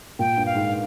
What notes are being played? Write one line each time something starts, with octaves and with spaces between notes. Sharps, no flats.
A#2 G5
G2
F5
G#2